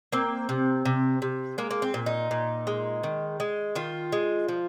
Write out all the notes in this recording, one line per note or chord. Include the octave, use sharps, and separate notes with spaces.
A#3 C4
C3
C3
C3
G#3 A#3
A#3
C4
A#2
D#4
A#2
G#3
D#3
G#3
D#3 F4
G#3
F3